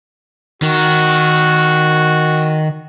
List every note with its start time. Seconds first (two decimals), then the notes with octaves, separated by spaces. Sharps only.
0.62 D#3 F#4